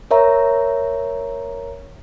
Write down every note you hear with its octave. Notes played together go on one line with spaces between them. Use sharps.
A#4 C#5 E5 A#5